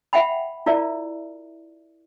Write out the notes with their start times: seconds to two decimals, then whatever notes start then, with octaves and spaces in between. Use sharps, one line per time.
0.13 E5 F#5 G5 B5
0.66 E4 F4 A#4 D5 E5